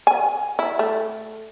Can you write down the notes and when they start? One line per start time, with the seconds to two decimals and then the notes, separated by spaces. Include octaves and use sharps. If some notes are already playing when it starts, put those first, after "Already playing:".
0.07 G#5
0.59 E4
0.79 A3